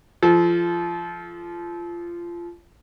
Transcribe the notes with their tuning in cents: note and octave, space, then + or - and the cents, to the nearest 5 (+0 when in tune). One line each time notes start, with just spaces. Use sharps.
F3 -20 A4 -30